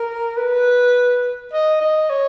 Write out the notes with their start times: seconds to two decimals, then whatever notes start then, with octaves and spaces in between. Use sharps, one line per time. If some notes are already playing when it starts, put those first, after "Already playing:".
Already playing: A#4
0.37 B4
1.53 D#5
1.81 D#5
2.10 C#5